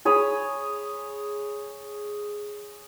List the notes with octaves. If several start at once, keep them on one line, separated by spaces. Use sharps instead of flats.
G#4 C#5 B5 D#6